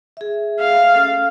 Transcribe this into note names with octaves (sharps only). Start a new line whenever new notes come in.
G#4 E5
F5
C#4 A4